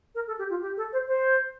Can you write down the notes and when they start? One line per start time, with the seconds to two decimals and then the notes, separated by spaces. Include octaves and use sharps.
0.15 A#4
0.27 A4
0.39 G4
0.50 F4
0.62 G4
0.77 A4
0.93 C5
1.07 C5